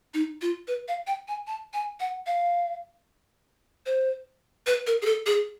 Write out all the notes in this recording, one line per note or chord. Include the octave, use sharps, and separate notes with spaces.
D#4
F4
B4
F5
G5
G#5
A5
G#5
F#5
F5
C5
B4
A#4
G#4
A4
G#4